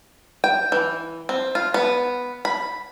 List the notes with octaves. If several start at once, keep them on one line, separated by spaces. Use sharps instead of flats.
G5
E3
C4
F4
B3
B5